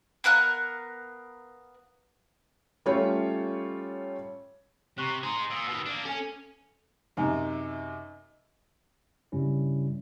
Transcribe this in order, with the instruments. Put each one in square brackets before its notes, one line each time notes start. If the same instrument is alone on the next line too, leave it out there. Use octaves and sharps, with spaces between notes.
[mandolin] B3 A#4 F5 F#6
[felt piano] G3 A3 C#4 F4 C#5
[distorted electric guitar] C3 [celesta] A#5 C#6 F#6
[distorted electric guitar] D#4 G#4 [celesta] A#5 C6
[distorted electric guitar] A#2 [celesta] D#6 E6
[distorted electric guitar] B2 D#3
A#3 D4
[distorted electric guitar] C#4 [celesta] A4 G#5
[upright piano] F#2 C3 [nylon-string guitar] D#4
[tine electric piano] G2 C#3 G3 C#4 E4